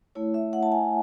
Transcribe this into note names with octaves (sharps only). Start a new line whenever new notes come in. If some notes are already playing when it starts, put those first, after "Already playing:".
A3 E4 C#5
E5
F#5
A5
G#5